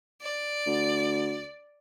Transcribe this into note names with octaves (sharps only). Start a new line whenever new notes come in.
D5
D2